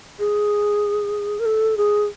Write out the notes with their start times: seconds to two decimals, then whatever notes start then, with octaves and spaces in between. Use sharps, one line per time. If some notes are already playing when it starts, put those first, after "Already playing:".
0.19 G#4
1.39 A#4
1.46 A4
1.77 G#4